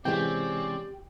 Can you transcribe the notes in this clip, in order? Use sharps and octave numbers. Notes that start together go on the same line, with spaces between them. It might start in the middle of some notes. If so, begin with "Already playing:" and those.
C3 E3 G#3 C4 C#4 G4 D5 G5